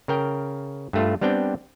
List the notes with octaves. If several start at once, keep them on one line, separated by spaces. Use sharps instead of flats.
C#3 A#4 G5
G2 A3 F4
G3 B3 C4 D4 G5